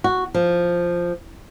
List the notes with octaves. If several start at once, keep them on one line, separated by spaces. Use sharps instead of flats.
F#4
F3